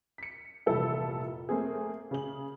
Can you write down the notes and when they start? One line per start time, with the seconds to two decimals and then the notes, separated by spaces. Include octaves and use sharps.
0.18 B6 C#7
0.66 F1 A#2 E3 G3 A4 E5
1.49 A3 A#3 C4 G#4
2.11 C#3 G#4 F#7